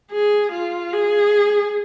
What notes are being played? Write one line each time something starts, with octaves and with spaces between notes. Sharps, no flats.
G#4
F4
G#4